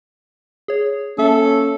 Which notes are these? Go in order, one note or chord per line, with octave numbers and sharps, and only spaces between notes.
G#4 C#5
A#3 C#4 A4 E5